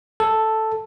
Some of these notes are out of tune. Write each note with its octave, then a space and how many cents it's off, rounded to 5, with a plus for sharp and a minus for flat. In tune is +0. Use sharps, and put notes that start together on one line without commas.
A4 +0